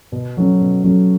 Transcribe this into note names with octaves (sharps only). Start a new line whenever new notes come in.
B2
F#3 A3 C#4
B2
F#3 A3 C#4